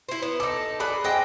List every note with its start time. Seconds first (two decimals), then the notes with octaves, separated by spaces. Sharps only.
0.09 E4 C5
0.22 B3
0.40 D#4 A4 D6
0.80 G#4 A4 D5 B5 F#6
1.04 C4 G#4 D#5 F#5 G5 A#6